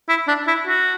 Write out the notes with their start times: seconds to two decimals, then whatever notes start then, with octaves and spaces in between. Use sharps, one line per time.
0.09 E4
0.28 D4
0.48 E4
0.67 F#4